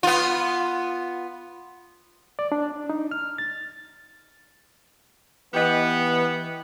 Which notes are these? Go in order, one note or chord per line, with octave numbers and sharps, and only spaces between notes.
B3 F4
D5
D4
D#4
F6
A6
E3 B3 G4 D#5